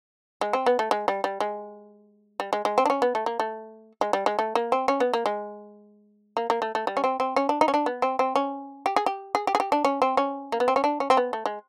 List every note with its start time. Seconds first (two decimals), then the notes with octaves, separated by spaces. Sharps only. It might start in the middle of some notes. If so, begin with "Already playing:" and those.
0.41 G#3
0.53 C4
0.66 B3
0.79 A3
0.91 G#3
1.08 G3
1.24 G3
1.40 G#3
2.40 G3
2.53 G#3
2.65 G#3
2.78 C4
2.85 D4
2.90 C#4
3.02 B3
3.15 A3
3.26 A#3
3.40 A3
4.01 G#3
4.13 G3
4.26 G#3
4.39 A3
4.55 A#3
4.72 C4
4.88 C#4
5.00 B3
5.13 A#3
5.26 G#3
6.37 A#3
6.50 A#3
6.62 A3
6.75 A3
6.87 G3
6.97 C#4
7.04 C4
7.20 C4
7.36 C#4
7.49 D4
7.61 D#4
7.68 C#4
7.74 D4
7.86 B3
8.02 C4
8.19 C4
8.36 C#4
8.86 G4
8.96 G#4
9.06 G4
9.35 G#4
9.47 G4
9.55 G#4
9.60 G4
9.72 D4
9.85 C#4
10.02 C4
10.17 C#4
10.52 A#3
10.60 B3
10.68 C4
10.76 C#4
10.84 D4
11.00 C#4
11.10 C4
11.17 B3
11.33 A3
11.46 G#3